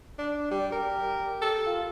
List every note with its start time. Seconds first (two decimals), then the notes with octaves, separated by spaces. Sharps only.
0.18 D4
0.51 G3
0.72 G4 A#4
1.41 A4
1.66 F4